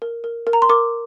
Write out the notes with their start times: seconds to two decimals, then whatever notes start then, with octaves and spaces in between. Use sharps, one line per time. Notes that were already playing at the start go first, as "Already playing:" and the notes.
0.02 A#4
0.24 A#4
0.47 A#4
0.53 A#5
0.62 C6
0.69 A#4 D6